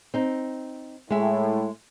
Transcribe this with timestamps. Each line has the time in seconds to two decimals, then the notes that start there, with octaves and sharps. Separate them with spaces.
0.14 C4 D#4
1.10 A2 G#3 E5